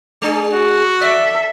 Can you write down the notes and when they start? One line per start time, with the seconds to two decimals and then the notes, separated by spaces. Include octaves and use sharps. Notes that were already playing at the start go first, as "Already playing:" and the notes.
0.22 G#3 D4 G#4
0.53 F#4
1.01 A4 D5 E5